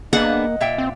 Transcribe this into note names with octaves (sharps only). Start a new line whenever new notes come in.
A#3 B3 D4 G#4 D#5 F#5
A#2 E5 G5
C4